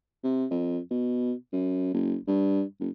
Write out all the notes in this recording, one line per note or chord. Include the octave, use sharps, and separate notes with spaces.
C3
F2
B2
F#2
F#1
G2
F#1